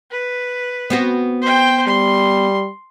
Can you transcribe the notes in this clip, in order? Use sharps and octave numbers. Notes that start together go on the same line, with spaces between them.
B4
B3 C4 F#4
C5 G5
G3 C6